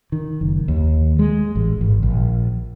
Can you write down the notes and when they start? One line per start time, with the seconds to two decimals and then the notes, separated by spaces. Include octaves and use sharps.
0.12 D#3
0.41 F#1
0.68 D#2
1.19 G#3
1.55 A1
1.81 G#1
2.03 A#1